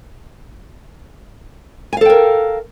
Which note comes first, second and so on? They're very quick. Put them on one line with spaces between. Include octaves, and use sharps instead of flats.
G#5 F5 A4 G5 A#4